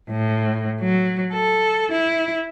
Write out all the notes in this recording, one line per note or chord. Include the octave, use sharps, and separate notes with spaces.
A2
F#3
A4
E4